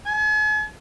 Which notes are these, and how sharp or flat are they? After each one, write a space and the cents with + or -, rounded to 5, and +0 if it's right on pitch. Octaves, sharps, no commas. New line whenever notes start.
G#5 +45